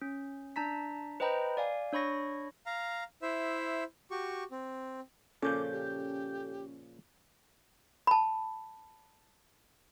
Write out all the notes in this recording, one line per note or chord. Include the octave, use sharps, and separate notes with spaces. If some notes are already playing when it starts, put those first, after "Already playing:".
C#4
D4 A5 A#5 B6
B4 C5 D#5 G5 A#5 B5
D5 F5 G#5
D4 C#5 B5 C#6 A#6
F5 A#5
E4 C5 E5
F#4 G4 C#6
C4
A#2 C#3 F3 C#4 A4 D6 G6
G4
A5 B5